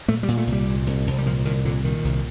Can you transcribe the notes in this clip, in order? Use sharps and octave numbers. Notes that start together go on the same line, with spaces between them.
A#2 A3
G3
A#2
A3
C2
G3
A#2
C2
C2
G3
A#2 F3
C2 D#3
A#2 D3
A#2 D#3
C2